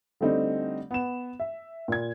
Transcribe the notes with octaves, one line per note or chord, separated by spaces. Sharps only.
D3 G3 A3 C4 D4 D#4
B3 E7
E5
A#2 G#6